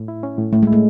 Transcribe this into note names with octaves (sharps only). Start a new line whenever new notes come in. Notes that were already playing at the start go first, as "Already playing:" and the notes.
Already playing: A2
E4
C#4
A2
A2 A3
G#3 E4
A3